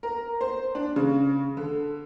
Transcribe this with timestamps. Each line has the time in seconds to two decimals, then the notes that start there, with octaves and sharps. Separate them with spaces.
0.03 A#4
0.41 C5
0.75 D4
0.96 C#3
1.57 D3